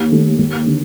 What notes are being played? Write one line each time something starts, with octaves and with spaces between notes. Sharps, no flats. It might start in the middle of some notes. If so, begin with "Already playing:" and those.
Already playing: D#2
D#3 A3
D#2
D3